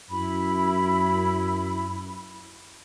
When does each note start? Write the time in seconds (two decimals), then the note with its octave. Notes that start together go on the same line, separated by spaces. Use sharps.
0.10 F#2 E4 B5